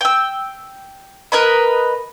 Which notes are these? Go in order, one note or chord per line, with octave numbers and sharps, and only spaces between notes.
G5 E6
A#4 B4 D#5 B5